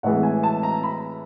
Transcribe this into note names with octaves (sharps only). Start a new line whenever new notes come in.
A2 E3 G#3 F#5
G#5
A5
A#5
B5